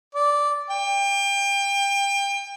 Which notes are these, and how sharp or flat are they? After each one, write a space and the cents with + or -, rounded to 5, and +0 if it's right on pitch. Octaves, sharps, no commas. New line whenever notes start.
D5 -10
G5 +30